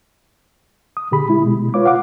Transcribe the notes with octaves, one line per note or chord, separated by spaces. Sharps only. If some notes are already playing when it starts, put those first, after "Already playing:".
D#6
A#2 D3 G4 G#4 B5
G#3 E4
B2 G#3
F4 B4 C#5 F5 D6
F5 F#5 D6